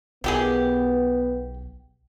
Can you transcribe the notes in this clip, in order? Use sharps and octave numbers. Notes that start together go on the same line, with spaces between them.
B1 D#3 B3 G4 G#4